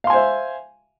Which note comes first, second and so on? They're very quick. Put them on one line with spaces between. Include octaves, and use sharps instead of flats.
F5 C6 G#5 C5 E5